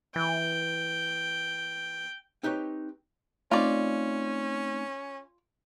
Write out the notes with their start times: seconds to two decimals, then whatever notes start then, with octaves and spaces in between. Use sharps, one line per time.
0.16 E3 G5
2.43 C4 D#4 G4 B4 C#5
3.51 A3 C4 C#4 D#4 F4 D5